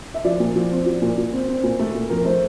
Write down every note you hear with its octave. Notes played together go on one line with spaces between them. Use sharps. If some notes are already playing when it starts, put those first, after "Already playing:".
E5
F3 D5
A#2
F3
C4
F3
A#2
A#2
C4
C4
A#2
A3
A#2
F2 A#4
A3 C5